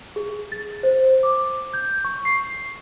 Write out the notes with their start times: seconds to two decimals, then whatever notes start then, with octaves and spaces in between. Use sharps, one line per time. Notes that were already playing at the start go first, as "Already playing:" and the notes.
0.16 G#4
0.52 A6
0.83 C5
1.23 D6
1.74 G6
2.04 C#6
2.25 C7